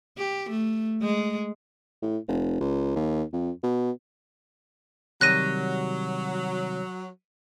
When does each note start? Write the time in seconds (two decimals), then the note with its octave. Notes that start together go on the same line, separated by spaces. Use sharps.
0.18 G4
0.50 A3
1.02 G#3
2.02 A2
2.28 F1
2.61 C#2
2.96 D#2
3.33 F2
3.63 B2
5.21 C3 D#3 F#3 G3 F#6 A#6 D#7